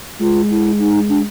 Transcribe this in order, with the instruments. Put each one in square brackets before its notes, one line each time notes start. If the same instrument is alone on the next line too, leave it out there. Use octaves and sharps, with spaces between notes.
[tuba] G#3 [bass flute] F4
[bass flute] E4
D#4
D4